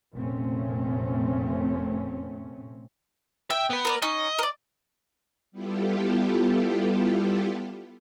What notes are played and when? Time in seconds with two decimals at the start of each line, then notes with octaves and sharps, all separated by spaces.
0.14 F1 A#2 A3 C4 C#4
3.50 E5 G5
3.70 B3 B4
3.85 A#4 C5 D5
4.02 C#4 D#4 D#5
4.39 A#4 D5
5.52 G3 B3 E4 F4 G4 A4